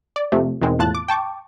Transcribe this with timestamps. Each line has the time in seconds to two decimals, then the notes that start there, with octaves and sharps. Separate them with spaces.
0.16 D5
0.32 F2 C3 F3 A3
0.61 E2 B2 D#3 G#3 C4
0.79 E2 A2 F4 A5 F#6 A6
0.95 D6
1.08 G5 A5 C#6 D6